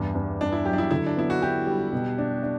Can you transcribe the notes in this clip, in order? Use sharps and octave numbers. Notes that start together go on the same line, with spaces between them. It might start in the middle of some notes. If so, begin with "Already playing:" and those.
Already playing: E2 G2
G2
G2 D4
E4
F#3 G4
D4
E4
D3 E4
D4
B3 E4
F#4
E4 G4
G3
B2
D4
D4